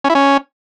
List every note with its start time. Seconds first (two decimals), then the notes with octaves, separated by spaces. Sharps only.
0.04 C#4
0.10 E4
0.15 C#4